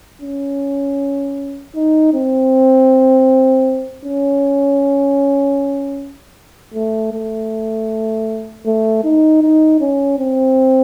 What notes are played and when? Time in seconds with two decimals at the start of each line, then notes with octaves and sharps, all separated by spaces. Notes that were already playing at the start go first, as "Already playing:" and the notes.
0.22 C#4
1.75 D#4
2.14 C4
4.05 C#4
6.74 A3
7.12 A3
8.66 A3
9.04 D#4
9.42 D#4
9.81 C#4
10.19 C4